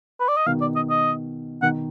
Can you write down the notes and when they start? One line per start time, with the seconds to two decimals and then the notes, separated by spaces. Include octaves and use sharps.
0.20 B4
0.29 D5
0.37 D#5
0.46 B2 D#3 F5
0.61 D5
0.76 D#5
0.90 D#5
1.62 B2 D#3 F#5